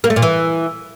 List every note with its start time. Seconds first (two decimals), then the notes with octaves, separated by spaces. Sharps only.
0.04 A#3
0.10 A3
0.16 A#2
0.22 E3